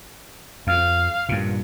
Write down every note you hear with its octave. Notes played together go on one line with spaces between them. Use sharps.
F2 F5
G2 A#2